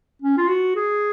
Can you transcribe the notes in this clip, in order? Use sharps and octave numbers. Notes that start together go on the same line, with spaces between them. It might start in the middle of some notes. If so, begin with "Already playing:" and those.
C#4
F4
F#4
G#4